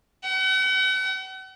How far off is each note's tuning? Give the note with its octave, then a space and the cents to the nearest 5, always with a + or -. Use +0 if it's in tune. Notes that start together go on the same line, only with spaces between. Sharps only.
F#5 +40